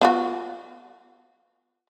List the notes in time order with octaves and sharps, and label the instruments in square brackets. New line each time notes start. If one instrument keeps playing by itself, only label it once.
[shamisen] B3 F4 F#4